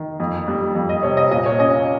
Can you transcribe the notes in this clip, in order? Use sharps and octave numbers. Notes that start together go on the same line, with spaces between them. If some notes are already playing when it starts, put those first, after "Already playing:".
Already playing: D#3
F2
G3
F2
D#5
C3 C#5
D#5
A#2 D#5
C#5
C#4 D#5